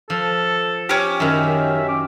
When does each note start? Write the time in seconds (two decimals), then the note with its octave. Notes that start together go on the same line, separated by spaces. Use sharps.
0.10 F3 A4
0.89 C#4 G4
1.20 F#2 D#3 E5
1.88 D6